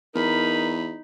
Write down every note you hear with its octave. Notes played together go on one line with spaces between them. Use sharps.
E2 D#4 A#4 B5